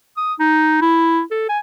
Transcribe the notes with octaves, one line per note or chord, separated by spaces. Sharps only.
D#6
D#4
E4
A4
G#5